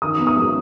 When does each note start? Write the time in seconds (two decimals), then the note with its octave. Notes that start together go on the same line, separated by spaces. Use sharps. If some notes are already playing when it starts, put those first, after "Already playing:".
0.02 D#3 D#6
0.19 B3
0.27 D#6
0.36 G#3